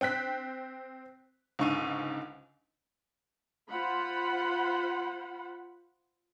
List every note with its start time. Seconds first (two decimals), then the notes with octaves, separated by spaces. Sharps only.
0.01 C4 G5 F#6 B6
1.59 C#2 G#2 D3 C#6 E6 D#7
3.69 F4 C5 F#5 B5